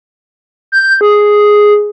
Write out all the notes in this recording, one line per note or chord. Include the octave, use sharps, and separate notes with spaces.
G6
G#4